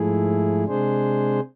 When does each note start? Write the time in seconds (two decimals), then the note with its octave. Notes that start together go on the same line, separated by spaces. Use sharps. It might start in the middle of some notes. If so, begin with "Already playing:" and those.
Already playing: G#2 F3 A3 E4 G#4
0.65 C3 G#3 D4 G#4 C5